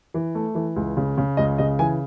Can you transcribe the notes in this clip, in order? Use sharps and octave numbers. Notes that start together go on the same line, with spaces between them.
E3
A3
E3
C#2
C#3
C#3
C#2 D#5
C#3 D#5
E3 G#5